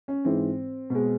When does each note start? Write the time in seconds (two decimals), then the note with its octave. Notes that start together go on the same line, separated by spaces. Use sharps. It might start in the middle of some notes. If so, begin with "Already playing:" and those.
0.08 C#4
0.25 G#2 E3 G#3 C4
0.90 B2 G#3